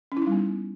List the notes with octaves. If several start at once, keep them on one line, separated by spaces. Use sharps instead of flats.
C#4
E4
D#4
G3
B3